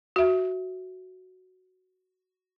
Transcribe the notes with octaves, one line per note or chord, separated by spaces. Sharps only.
F#4 E5